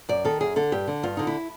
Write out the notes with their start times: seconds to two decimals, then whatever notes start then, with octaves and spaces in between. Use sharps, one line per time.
0.09 F#2 D5
0.25 D#3 A4
0.41 F#2 G#4
0.56 D3 A4
0.72 G2 G4
0.87 D3
1.03 G2 F4
1.17 D3 D#4
1.27 E4